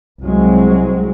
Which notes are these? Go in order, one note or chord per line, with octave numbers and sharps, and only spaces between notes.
C2 F#3 G#3 C4